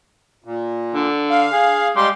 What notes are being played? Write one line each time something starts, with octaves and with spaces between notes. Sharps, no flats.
A#2
D3
F5
G#4
G3 G#3 G4 C6